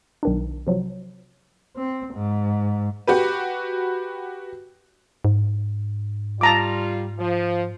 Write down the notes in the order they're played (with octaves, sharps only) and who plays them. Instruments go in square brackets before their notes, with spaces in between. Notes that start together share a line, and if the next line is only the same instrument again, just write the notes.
[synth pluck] B1 D#3 D4
C3 F3 F#3
[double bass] C4
G#2
[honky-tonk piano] F#4 G4 B4
[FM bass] G#2
[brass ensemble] G3 F4 [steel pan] A5 A#5 D6
[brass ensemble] F3